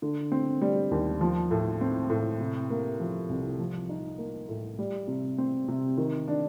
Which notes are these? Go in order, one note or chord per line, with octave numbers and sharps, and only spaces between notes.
D3
C4
G3
D#2
F3
A2
C4
A2
C3
A#3
F3
C2
F3
D#4
A#3
A2
G3
C3
C4
C3
D#3
D4